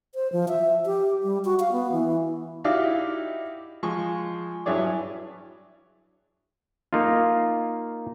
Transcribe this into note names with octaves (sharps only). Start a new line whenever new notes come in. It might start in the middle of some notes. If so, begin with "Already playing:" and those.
C5
F3
E5
G4
G3
F#4
F5
B3
E3
D#4 E4 F#4 G4 D5 F5
F3 G#3 C#6
G2 F#3 E4 G#4 C#5 D5
A#3 D#4 F4